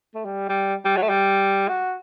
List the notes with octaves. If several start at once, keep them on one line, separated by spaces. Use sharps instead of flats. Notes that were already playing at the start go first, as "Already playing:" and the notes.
A3
G3
G3
G3
F#3
A3
G3
F#4